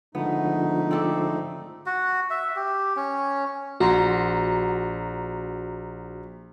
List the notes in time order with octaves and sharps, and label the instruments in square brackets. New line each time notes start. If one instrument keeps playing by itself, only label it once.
[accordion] G#2 A3 D#4 [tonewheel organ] D3 F3 [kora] B3
[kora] C4 A4 D5
[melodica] F#4
E5
G4
C#4
[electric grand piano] A#1 A#5 C6 [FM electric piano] F#4